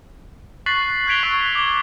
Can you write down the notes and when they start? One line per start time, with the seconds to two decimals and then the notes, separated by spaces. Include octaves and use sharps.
0.66 C#6 F#6 A6 B6 C7 F#7
1.07 F#6 G#6 B6 D7 F7 G7
1.23 C#6 E6 B6 D7
1.55 D6 G#6 G7